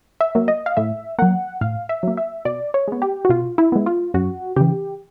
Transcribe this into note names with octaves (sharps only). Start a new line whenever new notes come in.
E5
F#3 A#3
D#5
F5
A2 E5
F#3 A#3 F#5
A2 F5
E5
F#3 A#3
E5
B2 D5
C#5
G#3 B3
G4
F#4
B2 F4
E4
G#3 B3
F4
F#2 F#4
C#3 E3 G4